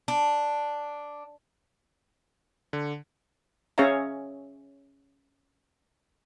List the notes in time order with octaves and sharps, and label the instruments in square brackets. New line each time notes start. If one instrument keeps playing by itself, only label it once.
[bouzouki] D4
[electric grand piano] D3
[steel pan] C#4 G#4 C#5 E5 F5 A#5